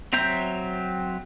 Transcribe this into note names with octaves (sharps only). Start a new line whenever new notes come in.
F#3 C4 E5 A#5 G6